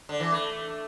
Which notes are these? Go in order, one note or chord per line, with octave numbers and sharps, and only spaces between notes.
D3
E3
A3